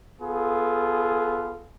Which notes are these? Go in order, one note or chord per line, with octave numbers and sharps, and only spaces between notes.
B3 F4 G#4 A4